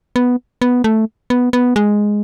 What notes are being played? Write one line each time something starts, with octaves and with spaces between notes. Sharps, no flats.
B3
B3
A3
B3
B3
G#3